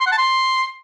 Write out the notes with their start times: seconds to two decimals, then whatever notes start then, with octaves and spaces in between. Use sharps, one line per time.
0.01 C6
0.06 F#5
0.12 A5
0.18 C6